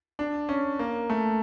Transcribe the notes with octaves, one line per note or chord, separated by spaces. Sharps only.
D4
C#4
A#3
A3